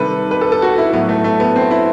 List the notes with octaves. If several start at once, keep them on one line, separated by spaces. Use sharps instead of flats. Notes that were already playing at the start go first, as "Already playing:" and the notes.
Already playing: C3 D#3 G3 A4 B4
B4
A4
A4
F#4
E4
A2 F#3 B3
A3
A3
B3
C4
E4